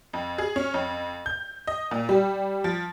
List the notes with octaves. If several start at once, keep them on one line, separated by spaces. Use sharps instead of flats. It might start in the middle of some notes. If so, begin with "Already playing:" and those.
F2
G#4
C#4
F2
G6
D#5
A#2
G3
F3